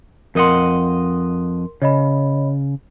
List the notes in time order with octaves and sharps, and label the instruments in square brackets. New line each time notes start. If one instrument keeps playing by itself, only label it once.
[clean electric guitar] F2 D#5 F#5 [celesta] A#4 C6
[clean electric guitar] C#3 [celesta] C#5 D#5 B5